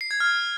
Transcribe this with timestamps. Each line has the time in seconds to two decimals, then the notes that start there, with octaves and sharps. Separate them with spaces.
0.01 C7
0.11 G#6
0.20 F6